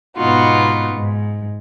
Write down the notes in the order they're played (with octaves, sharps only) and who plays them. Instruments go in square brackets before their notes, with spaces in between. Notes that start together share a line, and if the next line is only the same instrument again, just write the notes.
[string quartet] G#2 B2 B3 D#4 F4 F#4
G#2